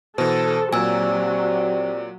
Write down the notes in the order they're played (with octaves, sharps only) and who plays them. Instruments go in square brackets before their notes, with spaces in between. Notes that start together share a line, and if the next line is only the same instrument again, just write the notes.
[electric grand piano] B2 E3 [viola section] A4 [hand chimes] C5
[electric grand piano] A#2 [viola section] F#3 [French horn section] C4 G4 D5 [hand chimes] G#5 E6